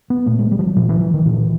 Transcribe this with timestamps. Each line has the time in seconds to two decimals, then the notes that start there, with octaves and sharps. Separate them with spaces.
0.10 B3
0.26 A#2 A3
0.39 G#3
0.52 G3
0.59 F3
0.63 F#3
0.76 A#2 F3
0.89 E3
1.01 E3
1.14 D#3
1.25 A#2 E3